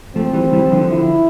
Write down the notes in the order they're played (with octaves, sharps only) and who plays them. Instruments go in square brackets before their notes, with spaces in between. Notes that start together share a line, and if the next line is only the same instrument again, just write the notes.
[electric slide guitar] F3 A3 [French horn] C4
[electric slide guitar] E3 G3
E3 G3
D3 F3
[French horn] E4